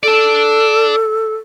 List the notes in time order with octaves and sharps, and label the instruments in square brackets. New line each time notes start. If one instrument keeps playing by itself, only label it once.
[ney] A4 [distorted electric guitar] D5 A5